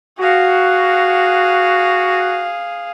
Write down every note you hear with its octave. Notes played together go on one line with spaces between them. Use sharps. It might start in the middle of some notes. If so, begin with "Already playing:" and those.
F#4 G#4 F5